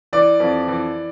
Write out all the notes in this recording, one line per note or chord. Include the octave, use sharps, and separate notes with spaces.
E3 D5
F2
E3